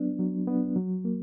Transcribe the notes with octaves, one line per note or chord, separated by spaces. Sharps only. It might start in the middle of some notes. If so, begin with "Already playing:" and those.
Already playing: F#3 B3 D4
F#3
B3 D4
F#3
A#3